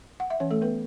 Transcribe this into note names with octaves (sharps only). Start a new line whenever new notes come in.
F#5
E5
E3 C#4 C#5
A3 A4
B3 B4